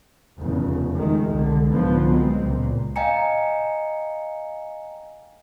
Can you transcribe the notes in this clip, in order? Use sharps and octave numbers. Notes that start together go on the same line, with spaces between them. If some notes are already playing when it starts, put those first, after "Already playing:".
F1 E2 C#3
D#3 G#3 A3
C2 D3 G#3
C2 G#2 D3 F3 B3
F#3 G#3 B3 C4
C#2 A#2
D#5 F5 G5 G#5 A#5 C#7